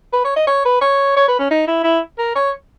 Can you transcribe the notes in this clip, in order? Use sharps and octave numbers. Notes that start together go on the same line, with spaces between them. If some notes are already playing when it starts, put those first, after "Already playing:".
B4
C#5
D#5
C#5
B4
C#5
C#5
B4
C#4
D#4
E4
E4
A#4
C#5